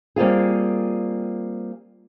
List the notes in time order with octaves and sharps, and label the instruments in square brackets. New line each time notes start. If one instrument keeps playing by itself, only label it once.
[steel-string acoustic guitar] G3 A#3 C4 F4 G#4